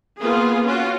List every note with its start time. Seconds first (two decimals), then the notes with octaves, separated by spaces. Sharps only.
0.21 A#3 B3 F4 G#4
0.64 C#4 F4 F#4